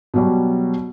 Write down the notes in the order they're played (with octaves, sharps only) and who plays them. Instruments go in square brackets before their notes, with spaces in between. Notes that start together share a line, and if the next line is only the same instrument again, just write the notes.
[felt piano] B2 F#3 G3